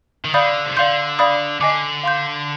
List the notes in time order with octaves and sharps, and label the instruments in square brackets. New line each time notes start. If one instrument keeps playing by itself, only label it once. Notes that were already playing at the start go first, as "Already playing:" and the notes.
[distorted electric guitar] D#3
[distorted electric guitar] D3 [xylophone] D5 F5 B5 D#6 G6
[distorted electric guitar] C3
[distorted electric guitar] D3 [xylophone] D5 F5 C6 G6
[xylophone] D5 F5 B5 D#6
[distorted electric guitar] D3 [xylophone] D#5 G#5 D6
[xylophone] F5 C6 G6